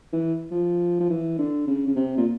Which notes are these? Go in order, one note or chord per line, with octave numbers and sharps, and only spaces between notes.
E3
F3
F3
E3
D3
C#3
C#3
C3
A#2